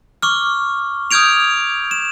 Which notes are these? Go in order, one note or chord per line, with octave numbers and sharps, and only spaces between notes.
C#6 D6 F6
D#6 F6 G6 G#6 D7 F7
E7